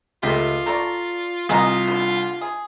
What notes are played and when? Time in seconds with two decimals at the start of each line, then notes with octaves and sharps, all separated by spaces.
0.23 C#2 A3 F4 G4
0.66 A4 D5 A#5 C#6
1.49 C2 F4 G#4 A#4 D#5
1.87 B2 D3
2.41 G#4